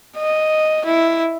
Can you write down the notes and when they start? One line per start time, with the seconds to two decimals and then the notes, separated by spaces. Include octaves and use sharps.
0.18 D#5
0.86 E4